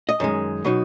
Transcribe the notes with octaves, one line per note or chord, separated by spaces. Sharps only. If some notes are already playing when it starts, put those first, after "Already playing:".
D#5
F#2 D#3 G#3
B2 F#3 D#4